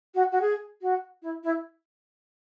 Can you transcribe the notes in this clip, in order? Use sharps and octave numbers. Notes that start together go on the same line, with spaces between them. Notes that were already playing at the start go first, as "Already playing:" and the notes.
F#4
F#4
G#4
F#4
E4
E4